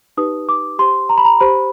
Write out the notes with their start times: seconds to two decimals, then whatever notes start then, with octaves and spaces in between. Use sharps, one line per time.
0.17 D#4 G4 B4 D#6
0.49 D6
0.79 G4 C5 C6
1.09 A#5
1.18 B5
1.25 A#5
1.40 G4 C5 B5